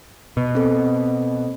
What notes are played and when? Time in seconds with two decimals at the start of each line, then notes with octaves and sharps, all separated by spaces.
0.37 B2
0.55 C4 A4